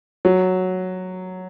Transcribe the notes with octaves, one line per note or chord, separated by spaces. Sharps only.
F#3